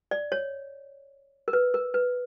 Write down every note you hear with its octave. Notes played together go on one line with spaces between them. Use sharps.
D5
C#5
A#4
B4
A#4
B4